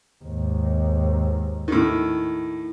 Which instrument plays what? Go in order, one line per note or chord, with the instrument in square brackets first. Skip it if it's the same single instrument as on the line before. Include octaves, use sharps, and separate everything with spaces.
[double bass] D#2 G#2
[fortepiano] A2 D#3